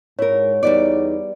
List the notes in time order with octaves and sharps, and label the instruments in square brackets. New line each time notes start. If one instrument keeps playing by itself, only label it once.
[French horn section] G#2 [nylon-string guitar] E4 A#4 [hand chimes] C#5
[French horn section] E2 D#4 [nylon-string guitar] G3 B3 D5